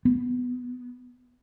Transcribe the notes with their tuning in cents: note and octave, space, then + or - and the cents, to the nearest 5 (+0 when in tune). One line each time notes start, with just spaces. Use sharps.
B3 +5